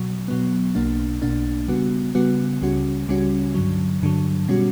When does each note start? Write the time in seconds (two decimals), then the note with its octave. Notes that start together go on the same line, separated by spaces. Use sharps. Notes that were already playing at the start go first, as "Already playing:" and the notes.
Already playing: B2 F#3
0.28 B2 F#3 B3
0.75 B1 B2 A#3 D4
1.22 B1 B2 A#3 D4
1.68 C#3 G3 B3 F#4
2.15 C#3 G3 B3 F#4
2.61 C#2 C#3 G3 C#4 F#4
3.08 C#2 C#3 G3 C#4 F#4
3.55 G2 D3 F#3
4.02 G2 D3 F#3
4.48 B2 G3 C#4 F#4